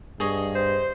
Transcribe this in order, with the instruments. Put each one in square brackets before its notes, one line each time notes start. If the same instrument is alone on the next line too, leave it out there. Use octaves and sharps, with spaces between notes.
[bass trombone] G2 [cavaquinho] G#4 C#5 D#5
[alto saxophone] C5